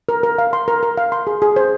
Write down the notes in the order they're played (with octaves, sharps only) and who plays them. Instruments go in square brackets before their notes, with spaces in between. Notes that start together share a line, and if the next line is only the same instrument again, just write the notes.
[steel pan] A#4
A#4
F5
C6
A#4
A#4
F5
C6
G#4
G#4
C5